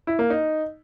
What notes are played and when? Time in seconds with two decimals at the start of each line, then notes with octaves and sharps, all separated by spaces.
0.07 E4
0.19 A#3
0.30 D#4